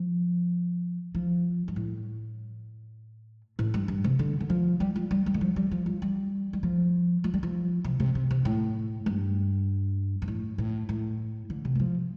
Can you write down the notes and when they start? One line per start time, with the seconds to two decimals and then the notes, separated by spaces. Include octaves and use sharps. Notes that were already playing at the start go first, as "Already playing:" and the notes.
Already playing: F3
1.15 F3
1.68 G2
1.76 A2
3.59 A2
3.74 G2
3.88 G2
4.04 C3
4.19 D3
4.40 D3
4.50 F3
4.80 G3
4.96 F3
5.11 G3
5.26 G3
5.34 D3
5.41 F3
5.56 G3
5.71 F3
5.86 F3
6.02 G3
6.53 G3
6.63 F3
7.24 F3
7.34 G3
7.43 F3
7.84 C3
8.00 C3
8.15 C3
8.31 C3
8.45 A2
9.06 G2
10.22 G2
10.28 A2
10.58 A2
10.89 A2
11.50 D3
11.65 C3
11.75 G3
11.80 F3